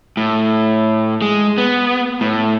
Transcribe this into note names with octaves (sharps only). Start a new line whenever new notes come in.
A2
G#3
B3
A2